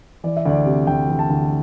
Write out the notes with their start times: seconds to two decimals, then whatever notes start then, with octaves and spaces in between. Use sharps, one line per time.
0.24 E3 D5
0.37 E5
0.46 D2 D5
0.65 C3
0.87 D2 G5
1.08 E3
1.19 A5
1.30 D2